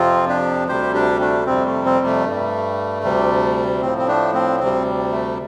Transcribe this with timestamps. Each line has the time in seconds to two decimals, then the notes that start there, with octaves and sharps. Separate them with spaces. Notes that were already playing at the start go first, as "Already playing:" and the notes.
Already playing: F2 C3 F3 C4 F4
0.29 D4 G4
0.68 D2 C3 G3 G4 C5
0.95 D4 G4
1.21 A3 D4
1.46 F2 C3 G3 C4
1.66 A3
1.86 C4
2.06 A3
2.25 G2 G3
3.03 D2 C3 G3
3.81 A2 F3 C4
3.98 C4
4.08 A3 D4
4.34 C4
4.60 D2 C3 G3 C4
5.12 A3